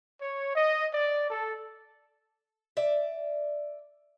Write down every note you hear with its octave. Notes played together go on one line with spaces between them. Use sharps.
C#5
D#5
D5
A4
D5 E5